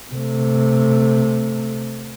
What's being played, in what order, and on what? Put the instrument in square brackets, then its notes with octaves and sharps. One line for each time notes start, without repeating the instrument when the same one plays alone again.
[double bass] C3 A3